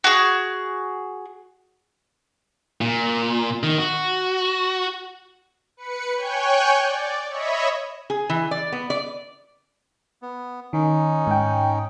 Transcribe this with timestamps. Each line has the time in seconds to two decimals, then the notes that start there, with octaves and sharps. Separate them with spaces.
0.04 F#4 G#4
2.81 A#2
3.63 D#3
3.79 F#4
5.77 B4 C#7
6.16 C#5 G5 G#5 C#6 F#6 G6
6.80 D5
7.30 C#5 D#5 E5 B5 C#6
8.10 G#4
8.30 E3
8.51 D5
8.72 B3
8.90 D5
10.22 B3
10.73 D#3 C#4 D#4
11.27 G#2 G5